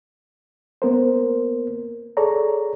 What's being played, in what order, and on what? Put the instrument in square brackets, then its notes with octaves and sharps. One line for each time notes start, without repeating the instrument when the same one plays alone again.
[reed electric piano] A#3 B3 A#4 C5
G#4 A4 C#5 D5 A#5